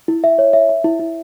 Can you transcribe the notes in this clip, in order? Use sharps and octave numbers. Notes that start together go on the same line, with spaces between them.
E4
E5
C#5
E5
E5
E4
E4